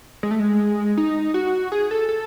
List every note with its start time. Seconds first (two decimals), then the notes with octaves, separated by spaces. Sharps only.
0.23 G#3
0.31 A3
0.40 G#3
0.98 D#4
1.34 F#4
1.72 G#4
1.91 A4
2.09 A4